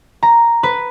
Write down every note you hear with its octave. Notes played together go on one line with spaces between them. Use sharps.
A#5
B4